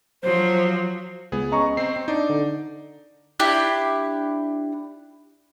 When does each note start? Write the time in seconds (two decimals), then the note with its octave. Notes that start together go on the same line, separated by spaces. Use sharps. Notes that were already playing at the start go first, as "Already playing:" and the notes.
0.23 F3 F#3 C5
1.32 C#2 B3 G#4
1.52 C#4 D#5 A#5 C#6
1.77 C4 C5 C7
1.96 C4
2.08 D4 D#4 D5
2.30 D3
3.40 D4 E4 G4